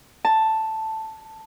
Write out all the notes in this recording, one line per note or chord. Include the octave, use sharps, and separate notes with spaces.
A5